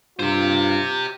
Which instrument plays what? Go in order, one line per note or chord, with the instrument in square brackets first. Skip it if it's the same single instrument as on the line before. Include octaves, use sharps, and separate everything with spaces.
[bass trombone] G2 [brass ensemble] F4 [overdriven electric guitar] G4 C5